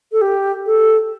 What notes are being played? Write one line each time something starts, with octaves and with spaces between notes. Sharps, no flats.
A4
G4
A4